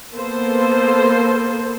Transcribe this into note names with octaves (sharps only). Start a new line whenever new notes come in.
A#3 B3 A4 C5